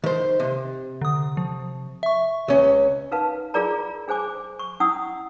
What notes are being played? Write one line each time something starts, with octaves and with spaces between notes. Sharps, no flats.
D#3 C5
C3
D3 D#6
F3
E5 C#6
C#2 C#4
D#4 A#4 B4 F5 A5
F4 G#4 A#4 D5 A#5
D4 G#4 C5 G#5 D6
C#6
C#4 D4 E4 F#5 D#6 E6